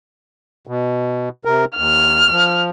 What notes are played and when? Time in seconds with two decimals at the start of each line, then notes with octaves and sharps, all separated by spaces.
0.67 B2
1.45 C3 A#4
1.77 D#2 F6
2.31 F3